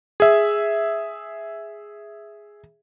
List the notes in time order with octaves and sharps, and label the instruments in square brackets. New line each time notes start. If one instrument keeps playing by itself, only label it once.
[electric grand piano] G#4 E5